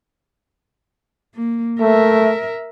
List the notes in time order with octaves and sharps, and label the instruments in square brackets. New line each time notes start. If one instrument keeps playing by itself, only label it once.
[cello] A#3
[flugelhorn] A3 [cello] A#4 E5